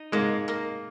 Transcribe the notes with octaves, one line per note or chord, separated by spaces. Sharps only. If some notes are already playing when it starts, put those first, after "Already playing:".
Already playing: D#4
G#2 G#3 A#3
A#3